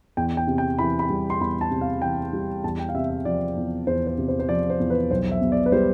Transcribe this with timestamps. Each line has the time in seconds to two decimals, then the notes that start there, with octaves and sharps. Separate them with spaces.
0.17 E2 G5
0.37 G5
0.47 C3
0.58 G5
0.78 E3 B5
0.99 B5
1.09 G3
1.30 C6
1.41 E2 B5
1.61 A5
1.71 C3
1.81 F5
2.02 E3 G5
2.33 G3
2.64 E2 A5
2.79 G5
2.89 F5
2.94 C3 E5
3.10 E5
3.25 F3 D5
3.57 E2
3.87 E2 C5
4.07 C5
4.18 C3
4.28 C5
4.39 C5
4.49 F3 D5
4.70 C5
4.80 E2
4.90 B4
5.10 B1 C5
5.31 E5
5.41 B2
5.52 D5
5.66 B4
5.72 G3 C5